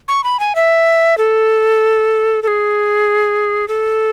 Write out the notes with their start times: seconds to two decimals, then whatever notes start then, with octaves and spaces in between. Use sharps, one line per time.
0.08 C#6
0.24 B5
0.40 G#5
0.55 E5
1.18 A4
2.43 A4
2.48 G#4
3.68 A4